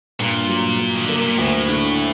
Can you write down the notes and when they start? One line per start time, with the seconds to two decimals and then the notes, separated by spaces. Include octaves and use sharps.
0.20 G2 A#2
0.49 F#3
0.79 G2
0.95 D#3
1.06 D3 A#3
1.16 C3
1.28 A#2
1.39 D2 A2
1.69 D3